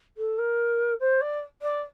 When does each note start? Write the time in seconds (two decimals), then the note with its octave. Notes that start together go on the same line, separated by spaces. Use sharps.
0.17 A4
0.38 A#4
1.00 C5
1.21 D5
1.62 D5